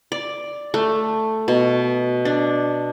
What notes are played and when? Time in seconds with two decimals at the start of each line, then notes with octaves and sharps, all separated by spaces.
0.12 D5
0.74 A3
1.48 B2
2.25 D4